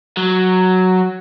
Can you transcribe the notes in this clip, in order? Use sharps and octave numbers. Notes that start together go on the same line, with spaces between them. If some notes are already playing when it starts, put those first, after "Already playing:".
F#3